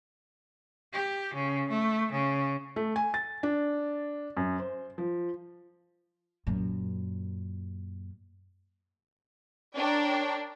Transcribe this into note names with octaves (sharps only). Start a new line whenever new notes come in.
G4
C#3
A3
C#3
A3
G#5
A6
D4
F#2
C5
F3
F#2 A#2
D4 A#4 C#5 G5